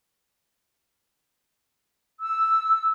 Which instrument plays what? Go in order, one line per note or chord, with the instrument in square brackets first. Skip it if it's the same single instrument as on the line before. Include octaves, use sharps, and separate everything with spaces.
[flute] E6